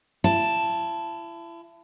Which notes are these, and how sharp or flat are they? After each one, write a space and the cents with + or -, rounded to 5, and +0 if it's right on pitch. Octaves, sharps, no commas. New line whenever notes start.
E4 +35 A5 +0